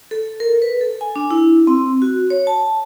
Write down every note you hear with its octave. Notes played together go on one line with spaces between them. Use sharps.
A4
A#4
B4
A4
G#5
D4
E4
C4
F#4
C#5
A5